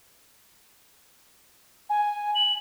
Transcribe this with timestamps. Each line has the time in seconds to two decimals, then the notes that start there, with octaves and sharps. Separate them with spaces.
1.90 G#5
2.35 F#7